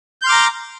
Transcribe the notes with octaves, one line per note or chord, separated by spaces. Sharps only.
A#5 C6 D6 F6 G6